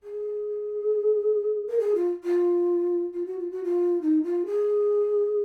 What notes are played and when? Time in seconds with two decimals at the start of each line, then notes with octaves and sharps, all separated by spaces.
0.03 G#4
1.68 A#4
1.79 G#4
1.95 F4
2.24 F4
3.14 F4
3.26 F#4
3.39 F4
3.51 F#4
3.64 F4
4.02 D#4
4.24 F4
4.46 G#4